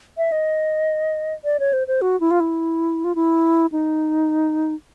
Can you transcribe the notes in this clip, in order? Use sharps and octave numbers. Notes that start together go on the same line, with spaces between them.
E5
D#5
D5
C#5
C5
C5
F#4
E4
F4
E4
F4
E4
D#4